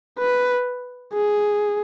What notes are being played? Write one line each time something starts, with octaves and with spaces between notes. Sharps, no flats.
B4
G#4